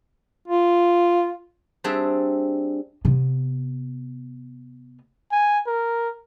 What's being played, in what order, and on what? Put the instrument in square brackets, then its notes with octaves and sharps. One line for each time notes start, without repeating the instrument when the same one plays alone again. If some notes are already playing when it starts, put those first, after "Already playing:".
[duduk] F4
[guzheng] G3 C4 D4 G#4 E5
[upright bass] C3 B3
[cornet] G#5
A#4